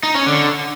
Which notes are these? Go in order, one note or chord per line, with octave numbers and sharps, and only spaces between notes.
D#4
C#4
D3